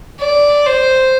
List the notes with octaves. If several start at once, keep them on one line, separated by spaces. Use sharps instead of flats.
D5
C5